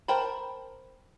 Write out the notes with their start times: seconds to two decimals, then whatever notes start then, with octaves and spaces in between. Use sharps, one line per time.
0.08 A#4 C5 G5 A5 B5